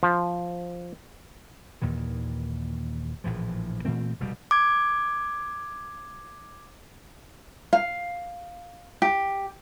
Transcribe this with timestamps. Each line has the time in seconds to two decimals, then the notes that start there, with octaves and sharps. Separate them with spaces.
0.03 F3
1.82 D#2 A#2 D#3 E3
3.24 A#1 A2 E3 F3
3.85 A#2 E3 A3 C4
4.20 F1 B2 G3
4.51 D6 G#6
7.73 F5
9.02 G4